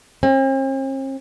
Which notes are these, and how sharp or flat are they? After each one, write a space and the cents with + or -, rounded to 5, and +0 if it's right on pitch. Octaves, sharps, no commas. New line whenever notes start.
C4 +45